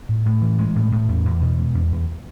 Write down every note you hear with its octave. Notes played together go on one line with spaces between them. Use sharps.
A2
A2
E3
G#3
A2
A2
E2
E2
B2
G#3
E2
E2